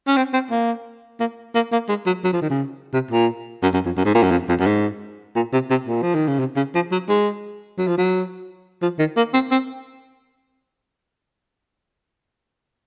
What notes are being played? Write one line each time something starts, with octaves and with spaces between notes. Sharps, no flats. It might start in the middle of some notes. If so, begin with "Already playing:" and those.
C#4
C4
C4
A#3
A#3
A#3
A#3
G#3
F#3
F#3
F3
D#3
C#3
C3
A#2
F#2
F#2
F2
F#2
G#2
A#2
F#2
F2
F2
F#2
G#2
A#2
C3
C3
A#2
F3
D#3
C#3
C3
C#3
F3
F#3
G#3
F#3
F3
F#3
F3
D#3
A#3
C4
C4